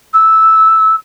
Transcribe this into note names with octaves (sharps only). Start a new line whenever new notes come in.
E6